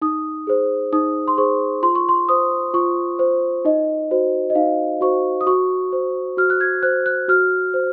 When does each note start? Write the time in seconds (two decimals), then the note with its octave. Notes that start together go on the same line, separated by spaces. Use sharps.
0.02 D#4 D#6
0.47 G#4 C5
0.93 D#4 D#6
1.28 C6
1.37 G#4 C5 C#6
1.83 F4 C6
1.95 C#6
2.09 C6
2.29 C5 D#6
2.74 F4 C#6
3.19 C5
3.65 D#4 D#5
4.11 F#4 C5
4.50 D#5
4.55 D#4 F5
5.01 F#4 C5 C#6
5.41 D#6
5.46 F#4 C#6
5.93 C5
6.37 F#4 F6
6.50 F#6
6.61 G#6
6.83 C5 F#6
7.06 F#6
7.28 F#4 F6
7.74 C5